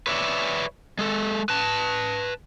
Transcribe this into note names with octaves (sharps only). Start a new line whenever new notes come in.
B4 C#5 D5 E5
G#3 A4
B4 A5